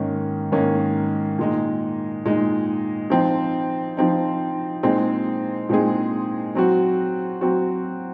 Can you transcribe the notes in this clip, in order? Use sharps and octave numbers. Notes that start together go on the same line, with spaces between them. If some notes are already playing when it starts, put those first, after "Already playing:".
Already playing: G#2 D#3 A#3 C#4
G#2 D#3 A#3 C#4
A#2 G#3 D#4
A#2 G#3 D#4
F3 C4 D#4
F3 C4 D#4
A#2 G#3 C4 D#4 G#4
A#2 G#3 C4 D#4 G#4
F#3 C4 F#4
F#3 C4 F#4